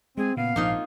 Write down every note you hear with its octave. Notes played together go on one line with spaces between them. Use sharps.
G#3 C4 G#4
A#2 C#3 B3 F5
A#1 G#2 F3 A#3 C4 D#4 F4